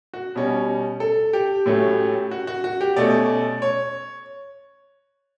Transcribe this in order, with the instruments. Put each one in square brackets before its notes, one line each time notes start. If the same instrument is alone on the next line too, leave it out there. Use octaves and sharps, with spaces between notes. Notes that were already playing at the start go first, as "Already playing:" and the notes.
[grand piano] F#4
B2 G3 C#4
A4
G4
A2 F#3 A3 C#4
F#4
F#4
F#4
G4
B2 A3 C#4 D5
C#5